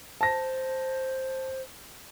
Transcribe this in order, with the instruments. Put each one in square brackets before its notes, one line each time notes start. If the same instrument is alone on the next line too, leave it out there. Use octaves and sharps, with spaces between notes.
[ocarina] C5 [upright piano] A5 A#6